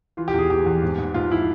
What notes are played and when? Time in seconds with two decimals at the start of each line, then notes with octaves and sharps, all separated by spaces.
0.17 E3 F4
0.28 G4
0.34 E2 G#4
0.50 E3 G4
0.66 E2
0.82 G#2
0.98 G#2
1.14 G#2 F4
1.31 F3 E4